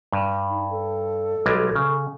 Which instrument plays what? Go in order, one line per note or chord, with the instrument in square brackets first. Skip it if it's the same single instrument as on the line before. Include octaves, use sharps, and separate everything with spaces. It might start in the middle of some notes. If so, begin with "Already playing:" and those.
[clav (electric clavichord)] G2
[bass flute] D#4
A4
[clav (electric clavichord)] B1 G3 G#3
C#3